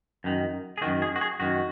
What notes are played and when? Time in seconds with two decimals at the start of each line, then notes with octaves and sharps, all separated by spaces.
0.24 F#2 D#3
0.78 G#4
0.81 D#3 F#4
0.86 F#2
1.02 G#4
1.16 F#4
1.21 G#4
1.40 F#2 D#3 F#4